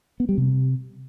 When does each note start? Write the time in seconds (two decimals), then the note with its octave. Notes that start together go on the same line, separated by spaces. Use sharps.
0.20 B3
0.29 G3
0.38 C3